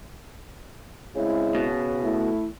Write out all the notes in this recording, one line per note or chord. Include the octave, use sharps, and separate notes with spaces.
C#3 G#3 C4 E4
B2
A3 E4